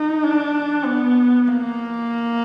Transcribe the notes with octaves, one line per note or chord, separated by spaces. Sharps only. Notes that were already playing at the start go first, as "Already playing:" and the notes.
Already playing: D#4
D4
B3
A#3